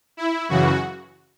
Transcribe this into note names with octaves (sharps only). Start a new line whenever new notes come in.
E4
F#2 C#3 E3 F#4